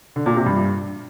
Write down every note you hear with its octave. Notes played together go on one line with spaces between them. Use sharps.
D3
A#2
C3
G2